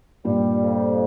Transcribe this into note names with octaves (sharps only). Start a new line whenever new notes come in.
G2 A#2 G3
F2